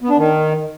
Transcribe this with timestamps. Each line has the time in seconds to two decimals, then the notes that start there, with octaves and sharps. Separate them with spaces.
0.01 B3
0.09 D4
0.18 D#3